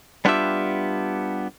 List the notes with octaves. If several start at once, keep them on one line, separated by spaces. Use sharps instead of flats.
G3 B3 D4 F4 G4 E5